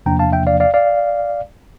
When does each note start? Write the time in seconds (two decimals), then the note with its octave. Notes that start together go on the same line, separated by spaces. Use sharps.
0.06 E2 C3 F3 A#3 D4 G5 A#5
0.19 F5 A5
0.32 E5 G5
0.47 D5 F5
0.60 D5 F5
0.74 D5 F5